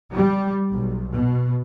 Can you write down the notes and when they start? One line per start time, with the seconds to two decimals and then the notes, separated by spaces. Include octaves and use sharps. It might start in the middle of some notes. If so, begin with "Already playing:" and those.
0.13 G3
0.72 B1
1.13 B2